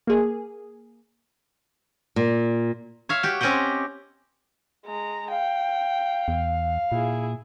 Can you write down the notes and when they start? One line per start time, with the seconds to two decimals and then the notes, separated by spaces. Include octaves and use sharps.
0.07 A#3 G#4
2.16 A#2
3.09 C#5 E5 F5
3.23 F#4 G4
3.41 C4 C#4 G4 D#5 F#5 G5
4.86 G#3 A#5
5.31 F5 G5
6.28 E2
6.92 A#2 E4 G#4